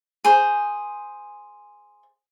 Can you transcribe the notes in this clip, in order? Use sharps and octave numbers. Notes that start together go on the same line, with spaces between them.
G#4 C5